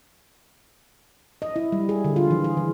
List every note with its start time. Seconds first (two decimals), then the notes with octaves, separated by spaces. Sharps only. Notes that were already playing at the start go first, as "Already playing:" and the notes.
1.42 D#5
1.56 E4
1.72 G3
1.89 G#4
2.05 D3
2.16 F4
2.31 E3
2.44 G#4
2.57 E3